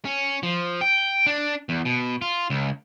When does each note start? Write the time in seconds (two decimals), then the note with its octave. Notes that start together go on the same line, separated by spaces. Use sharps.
0.05 C#4
0.43 F3
0.81 G5
1.26 D4
1.69 E2
1.85 B2
2.22 F4
2.50 C#2